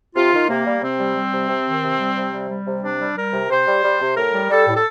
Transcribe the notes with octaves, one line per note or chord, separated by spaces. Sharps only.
C3 F4
D#3
C3 A#3
G3
C3 C4
G3
G3
C3
C3
D#3
C3
G3
C3
G3
G3
C3
C3 D4
G3
G3 A#4
C3
C3 C5
G3
G3
C3
A2 A#4
G3
G3 A4
A2
A4